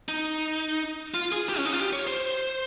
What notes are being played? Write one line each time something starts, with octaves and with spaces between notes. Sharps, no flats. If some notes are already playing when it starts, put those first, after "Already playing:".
D#4
F4
G#4
G4
C#4
D#4
F4
G4
C#5
C5